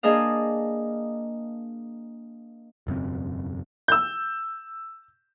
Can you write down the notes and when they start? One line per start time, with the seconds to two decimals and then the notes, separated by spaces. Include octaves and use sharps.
0.03 A#3 D4 G#4 D#5 F5
2.87 E1 F#2 C#3 C4
3.88 E6 G6